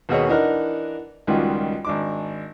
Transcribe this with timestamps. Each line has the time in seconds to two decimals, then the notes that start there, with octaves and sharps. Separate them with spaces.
0.09 D#2 B2 F#4 G#4 C#5
0.29 E3 D4 D#4 A#4 F#5
1.27 C#2 D#3 G3 C#4 F4 F#4
1.85 G#1 D4 D6